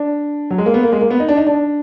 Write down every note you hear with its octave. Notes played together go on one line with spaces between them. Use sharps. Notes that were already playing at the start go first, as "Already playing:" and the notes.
Already playing: D4
F#3
G#3
A#3
B3
A#3
G#3
A#3
B3
D#4
D4
D#4
D4